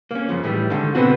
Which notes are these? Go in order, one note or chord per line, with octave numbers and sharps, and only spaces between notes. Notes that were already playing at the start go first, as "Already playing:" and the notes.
A#3 C#4
F#2 C#3 F3
A2 D#3 E3 G3
G#2 D3 D#3
B2 D3 B3 C4 D4 F#4